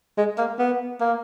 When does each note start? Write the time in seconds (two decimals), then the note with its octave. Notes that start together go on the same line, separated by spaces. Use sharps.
0.18 G#3
0.38 A#3
0.59 B3
1.00 A#3